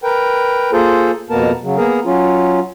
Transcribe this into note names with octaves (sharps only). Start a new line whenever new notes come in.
A#4 B4 G5
A#3 F4 G#4 A4 C5
F2 B2 A#3 B3 A#4 A5
C#3 F#3
A#3 B3 G#4 A#4
F#3 C#4 F4